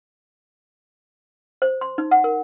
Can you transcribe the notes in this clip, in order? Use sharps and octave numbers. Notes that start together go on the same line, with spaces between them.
C5
C6
D#4
F#5
A#4